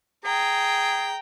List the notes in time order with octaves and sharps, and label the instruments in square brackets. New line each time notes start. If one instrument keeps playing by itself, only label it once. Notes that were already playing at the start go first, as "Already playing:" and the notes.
[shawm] G#4 [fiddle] G5 A#5